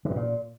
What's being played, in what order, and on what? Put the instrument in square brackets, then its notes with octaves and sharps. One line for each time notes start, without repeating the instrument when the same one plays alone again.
[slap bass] D3
A2
A#2